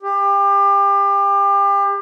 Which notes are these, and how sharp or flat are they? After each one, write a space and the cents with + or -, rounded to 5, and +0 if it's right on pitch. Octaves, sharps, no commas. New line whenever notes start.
G4 +30